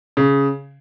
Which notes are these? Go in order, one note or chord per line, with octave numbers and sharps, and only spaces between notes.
C#3